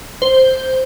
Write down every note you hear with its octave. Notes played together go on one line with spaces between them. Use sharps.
C5